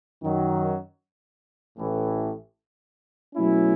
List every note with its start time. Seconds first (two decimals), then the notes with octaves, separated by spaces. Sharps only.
0.22 F#2 D#3 F#3
1.78 A1 A2 E3
3.34 B2 F#3 A3 C#4 E4